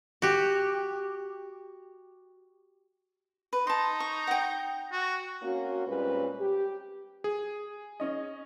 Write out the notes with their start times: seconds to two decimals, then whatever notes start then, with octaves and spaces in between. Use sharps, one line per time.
0.22 F#4 G4
3.53 B4
3.67 D#4 A5 C6
4.00 C#6
4.27 F#5 G5
4.92 F#4
5.43 A#3 C4 C#4 F#4
5.87 A#2 G3 G#3 C4 C#4 B4
6.40 G4
7.24 G#4
8.00 C#4 D#5